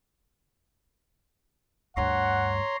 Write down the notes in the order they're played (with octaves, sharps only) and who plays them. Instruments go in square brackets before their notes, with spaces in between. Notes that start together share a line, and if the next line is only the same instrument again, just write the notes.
[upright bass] D2 G2 [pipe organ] C#5 A#5 C6 [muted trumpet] F#5